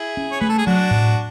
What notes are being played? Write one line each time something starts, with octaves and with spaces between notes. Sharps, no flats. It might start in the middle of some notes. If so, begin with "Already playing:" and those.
Already playing: E4 G#4
C#4
C#5
A3 B4
A4
G#4
F#3 D4 F#4
A2